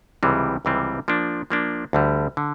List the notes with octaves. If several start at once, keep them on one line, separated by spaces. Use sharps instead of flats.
C#2 C3 E3 G3 C4
C#2 C3 E3 G3 C4
F3 A#3 D4
F3 A#3 D4
D2 D3 G3
D3